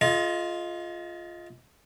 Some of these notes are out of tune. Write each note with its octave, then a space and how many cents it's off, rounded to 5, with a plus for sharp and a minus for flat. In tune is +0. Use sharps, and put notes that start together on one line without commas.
F4 +0 A4 -45 D#5 +20